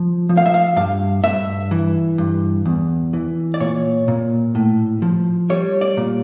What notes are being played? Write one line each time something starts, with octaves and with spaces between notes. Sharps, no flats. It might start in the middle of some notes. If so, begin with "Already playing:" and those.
Already playing: F3
F3
F5
E5
F5
G2 F5
G2 E5
E3
G2
E2
E3
D5
A#2 C#5
A#2
A2
F3
G3 C#5
D5
A#2